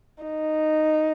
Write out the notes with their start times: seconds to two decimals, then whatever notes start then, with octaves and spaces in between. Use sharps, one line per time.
0.23 D#4